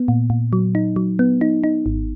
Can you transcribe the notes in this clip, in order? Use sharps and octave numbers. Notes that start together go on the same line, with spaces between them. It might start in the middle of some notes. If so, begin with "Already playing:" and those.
Already playing: B3
A#2
A#2
F#3
D#4
F#3
B3
D#4
D#4
G#1